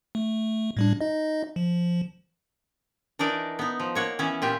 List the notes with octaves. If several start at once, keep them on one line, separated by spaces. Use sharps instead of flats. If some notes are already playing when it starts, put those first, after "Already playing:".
A3
A2 G3 D4
D#4 D#5
F3
E3 D4 D#4 A#4 D5
B3 D#4
F3
A#3 C#5 F#5
E3 B3 C#4
A#2 F4 G4 E5